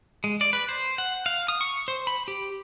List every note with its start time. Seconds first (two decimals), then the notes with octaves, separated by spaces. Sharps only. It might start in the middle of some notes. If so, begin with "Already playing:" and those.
0.24 G#3
0.41 D5
0.53 B4
0.69 C5
0.98 F#5
1.26 F5
1.48 D#6
1.61 C#6
1.88 C5
2.07 B5
2.28 G4